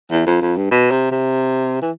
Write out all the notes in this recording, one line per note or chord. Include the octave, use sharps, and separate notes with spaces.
E2
F2
F2
G2
B2
C3
C3
E3